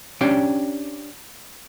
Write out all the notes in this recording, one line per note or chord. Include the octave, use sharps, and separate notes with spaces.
C#4 D4 G4 G5